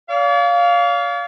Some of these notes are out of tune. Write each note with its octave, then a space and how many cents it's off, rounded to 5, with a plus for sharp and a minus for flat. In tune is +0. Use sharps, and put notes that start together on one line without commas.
D5 -45 F5 +0